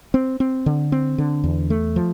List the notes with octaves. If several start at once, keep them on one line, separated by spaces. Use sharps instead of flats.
C4
C4
D3
C4
D3
E2
A3
F3